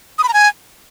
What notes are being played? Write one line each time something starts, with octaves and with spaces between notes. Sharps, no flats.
D#6
B5
A#5
G#5